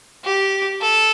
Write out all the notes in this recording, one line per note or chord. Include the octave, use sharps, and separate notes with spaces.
G4
A4